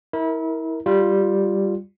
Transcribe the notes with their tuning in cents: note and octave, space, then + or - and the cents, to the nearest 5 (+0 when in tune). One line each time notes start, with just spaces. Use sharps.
E4 -30 A#4 +0
G3 +0 F4 +0